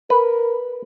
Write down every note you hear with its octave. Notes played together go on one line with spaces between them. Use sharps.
A#4 B4